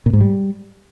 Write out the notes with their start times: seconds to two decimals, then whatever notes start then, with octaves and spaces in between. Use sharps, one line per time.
0.06 A#2
0.13 G#2
0.21 G3